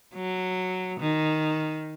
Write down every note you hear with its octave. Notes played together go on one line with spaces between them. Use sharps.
F#3
D#3